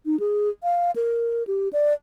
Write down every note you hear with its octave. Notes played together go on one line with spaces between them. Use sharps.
D#4
G#4
F5
A#4
G4
D5